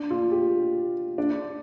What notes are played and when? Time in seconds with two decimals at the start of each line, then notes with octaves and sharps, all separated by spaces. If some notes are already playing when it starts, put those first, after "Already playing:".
Already playing: D4
0.10 F4
0.32 G4
1.18 D4